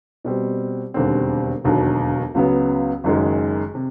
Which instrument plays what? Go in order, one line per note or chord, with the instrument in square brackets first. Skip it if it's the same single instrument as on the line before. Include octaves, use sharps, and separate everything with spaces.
[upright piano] B2 G3 C4
E1 D#2 D3 G3 C4
E1 D#2 D3 F#3
C#2 C#3 F#3 B3
F#1 F#2 D#3 G#3
C3